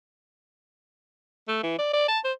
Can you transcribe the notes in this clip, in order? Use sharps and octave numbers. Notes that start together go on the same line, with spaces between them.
A3
E3
D5
D5
A5
C5